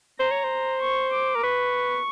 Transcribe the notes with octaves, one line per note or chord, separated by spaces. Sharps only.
C5 A#5
C#5
C5
C#6
D6
A#4
B4 C#6